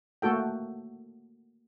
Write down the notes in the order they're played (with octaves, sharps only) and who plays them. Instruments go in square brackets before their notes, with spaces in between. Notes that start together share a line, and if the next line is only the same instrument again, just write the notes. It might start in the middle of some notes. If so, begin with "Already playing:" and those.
[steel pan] A3 A#3 F#4 A4 G5